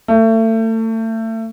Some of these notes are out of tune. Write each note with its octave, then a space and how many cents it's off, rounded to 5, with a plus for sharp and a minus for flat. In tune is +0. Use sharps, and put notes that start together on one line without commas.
A3 +30